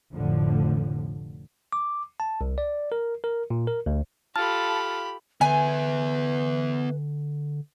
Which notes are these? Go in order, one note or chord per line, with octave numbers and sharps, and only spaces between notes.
F1 A2 D3 F3
D6
A5
C2
D5
A#4
A#4
A#2
A#4
D2
F4 G4 A4 A5 B5 F6
D3 B3 B4 E5 G#5